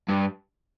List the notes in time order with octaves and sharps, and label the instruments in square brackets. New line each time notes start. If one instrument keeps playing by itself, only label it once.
[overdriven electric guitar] G2